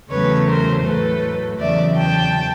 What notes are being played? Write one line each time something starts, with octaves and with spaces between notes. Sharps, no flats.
E2 C#3 F#3 A3 B4 C#5
A#4 C5
A2 F#3 A3 A4 B4
E2 C#3 F#3 D5 E5
G5 A5